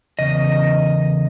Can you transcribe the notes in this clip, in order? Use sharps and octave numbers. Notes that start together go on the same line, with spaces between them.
E2 C#3 D#5